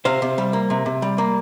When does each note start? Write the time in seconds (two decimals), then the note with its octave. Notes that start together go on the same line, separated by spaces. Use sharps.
0.05 C3 C5 F5
0.22 C3
0.38 G3
0.53 A#3
0.70 C3
0.86 C3
1.02 G3
1.18 A#3